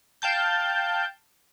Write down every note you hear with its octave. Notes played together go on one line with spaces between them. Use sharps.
F5 G5 A5 G6